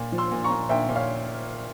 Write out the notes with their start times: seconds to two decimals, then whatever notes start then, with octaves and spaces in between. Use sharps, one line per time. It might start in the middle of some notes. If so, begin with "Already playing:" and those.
Already playing: A#2
0.12 F3
0.18 C6 E6
0.31 A#2
0.44 A#5 C#6
0.51 A#2
0.69 A#2 E5 G5
0.89 A#2
0.95 C#5 F5